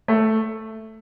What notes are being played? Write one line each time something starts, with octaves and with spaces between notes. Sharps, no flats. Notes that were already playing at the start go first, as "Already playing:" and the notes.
A3